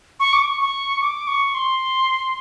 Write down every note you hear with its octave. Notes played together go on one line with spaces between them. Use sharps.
C#6
D6
C#6
C#6
D6
C#6
C6